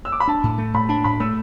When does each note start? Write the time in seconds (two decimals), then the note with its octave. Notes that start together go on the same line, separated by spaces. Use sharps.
0.05 E6
0.12 D6
0.20 B5
0.27 D4 A5
0.44 A2
0.58 A3
0.74 A2 B5
0.89 D4 A5
1.04 A2 B5
1.20 A3 E6